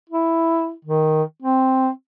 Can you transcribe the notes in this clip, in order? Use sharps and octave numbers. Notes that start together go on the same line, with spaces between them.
E4
D#3
C4